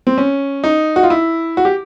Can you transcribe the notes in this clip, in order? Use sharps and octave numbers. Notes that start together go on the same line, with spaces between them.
C4
C#4
D#4
F#4
F4
E4
F#4
G4